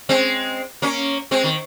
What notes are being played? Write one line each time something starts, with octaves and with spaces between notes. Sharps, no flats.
G#3 C4
A#3 C#4
G#3 C4
D#3